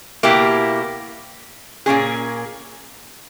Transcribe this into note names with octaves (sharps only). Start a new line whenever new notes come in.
B2 A#3 E4 G4
A#2 A#3 C#4 G#4